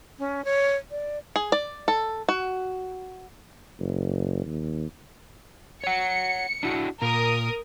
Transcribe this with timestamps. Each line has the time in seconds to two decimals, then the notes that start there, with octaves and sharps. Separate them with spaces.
0.19 C#4
0.45 C#5
0.91 D5
1.36 G#4
1.52 D5
1.88 A4
2.29 F#4
3.79 F#1
4.45 D#2
5.84 C#5 F#5 C#7
6.63 D4 E4 F#4
7.02 A#2 A#4 D#6